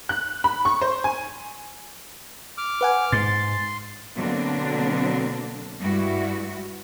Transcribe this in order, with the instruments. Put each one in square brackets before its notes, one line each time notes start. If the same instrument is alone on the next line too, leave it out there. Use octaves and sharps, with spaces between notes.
[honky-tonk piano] F#6
B5
C#6
C5
G#5
[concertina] D6 F6
[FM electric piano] B4 F#5 G#5
[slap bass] G#2 [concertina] C6 [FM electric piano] A6
[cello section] B2 D3 F#3 A#3 C4 D4
G2 G3 G#3 E4 F#4